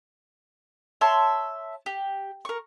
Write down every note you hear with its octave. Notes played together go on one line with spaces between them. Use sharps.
C#5 E5 A5 C6
G4
A#4 C#6